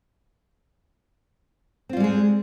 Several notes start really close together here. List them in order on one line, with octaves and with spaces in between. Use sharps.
C4 F4 G3 G#3 G#4